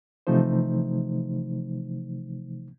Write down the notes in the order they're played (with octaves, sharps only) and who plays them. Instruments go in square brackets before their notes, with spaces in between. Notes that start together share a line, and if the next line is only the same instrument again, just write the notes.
[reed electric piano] C3 E3 F3 A3 D#4 C5